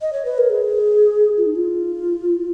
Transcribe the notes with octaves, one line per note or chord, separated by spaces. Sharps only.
D#5
C#5
B4
A#4
G#4
F4
D#4
F4